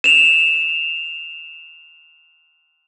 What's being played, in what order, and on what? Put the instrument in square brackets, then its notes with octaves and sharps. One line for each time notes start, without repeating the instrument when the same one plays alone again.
[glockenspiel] E7 F7